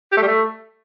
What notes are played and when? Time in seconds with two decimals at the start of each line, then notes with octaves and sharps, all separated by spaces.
0.12 G4
0.17 A3
0.22 G3
0.28 A3